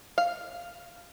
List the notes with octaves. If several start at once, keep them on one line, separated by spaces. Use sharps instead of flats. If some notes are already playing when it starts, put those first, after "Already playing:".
F5